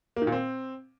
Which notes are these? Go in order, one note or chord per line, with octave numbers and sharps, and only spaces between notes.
A#3
D#3
A#2
C4